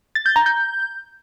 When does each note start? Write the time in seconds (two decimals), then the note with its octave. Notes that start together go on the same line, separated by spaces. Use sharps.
0.15 A6
0.26 G6
0.36 A#5
0.46 G6